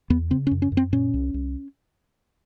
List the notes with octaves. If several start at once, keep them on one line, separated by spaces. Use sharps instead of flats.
E2 B3
C#3 C4
C#4
F#2
C#4
F#2
C4
A#2 C#4
C2
C2